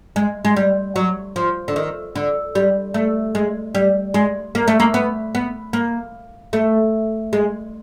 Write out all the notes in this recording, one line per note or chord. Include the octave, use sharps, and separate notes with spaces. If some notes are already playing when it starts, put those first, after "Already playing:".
G#3
G#3
G3
F#3
F3
D3
D#3
D3
G3
A3
G#3
G3
G#3
A#3
A3
A#3
B3
B3
A#3
A3
G#3